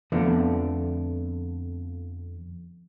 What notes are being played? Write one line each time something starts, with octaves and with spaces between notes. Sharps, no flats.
F2 D3 F3 A3 B3 D4